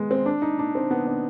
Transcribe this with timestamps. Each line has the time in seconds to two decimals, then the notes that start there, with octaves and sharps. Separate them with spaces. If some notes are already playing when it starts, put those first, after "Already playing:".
Already playing: G#3 B3
0.11 C4
0.26 D4
0.42 D#4
0.59 D4
0.75 C4
0.91 B3
1.07 D4